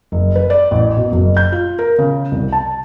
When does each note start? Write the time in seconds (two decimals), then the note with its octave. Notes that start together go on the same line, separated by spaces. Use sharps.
0.12 F#1
0.35 B4
0.50 D5
0.71 A1
0.97 B2
1.12 F#1
1.37 G6
1.52 F4
1.79 A#4
1.99 C#3
2.32 C2
2.52 A5